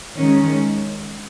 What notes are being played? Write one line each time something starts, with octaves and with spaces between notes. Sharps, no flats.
D#3 G#3 C#4